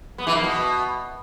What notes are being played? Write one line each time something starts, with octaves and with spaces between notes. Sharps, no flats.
B3
E3
A#3
B2